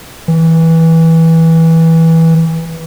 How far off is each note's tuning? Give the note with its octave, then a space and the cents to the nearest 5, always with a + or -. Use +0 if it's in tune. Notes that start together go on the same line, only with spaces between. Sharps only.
E3 -15